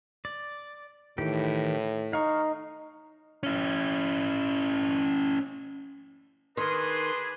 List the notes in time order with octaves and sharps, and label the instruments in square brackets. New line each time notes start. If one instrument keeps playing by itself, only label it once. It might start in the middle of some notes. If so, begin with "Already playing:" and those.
[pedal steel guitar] D5
[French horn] A2 [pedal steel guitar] D#3 E3 G4
[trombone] D#4 [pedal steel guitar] F5 C#6
[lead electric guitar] C#4 E4
[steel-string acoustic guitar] D#3 A#4 [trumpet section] D4 G#4 [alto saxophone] B4 [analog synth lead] C6